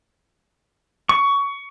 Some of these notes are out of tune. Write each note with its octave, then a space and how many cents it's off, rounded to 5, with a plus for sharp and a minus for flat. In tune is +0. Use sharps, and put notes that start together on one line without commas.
C#6 +20